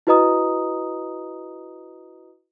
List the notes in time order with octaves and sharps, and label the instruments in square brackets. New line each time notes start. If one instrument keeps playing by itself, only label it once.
[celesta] E4 F#4 B4 D#5 A#5 D#6